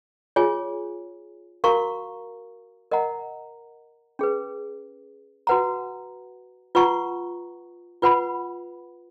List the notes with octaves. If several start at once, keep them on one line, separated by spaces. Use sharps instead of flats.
F4 G#4 C#5 G#5
F#4 A#4 F5 A#5 C#6
A#4 D#5 F#5 A#5
C#4 G#4 B4
F#4 B4 F#5 A#5
F4 B4 F#5 A#5 C#6
F4 B4 F#5 B5